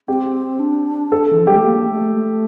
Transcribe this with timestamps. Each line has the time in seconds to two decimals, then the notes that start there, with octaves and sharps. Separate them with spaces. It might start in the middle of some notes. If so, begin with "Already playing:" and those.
0.08 C4 G4
0.59 D4
1.12 A4
1.33 E3
1.40 F3
1.47 G3 G4
1.55 A3
1.63 A#3
1.89 A3
2.15 A3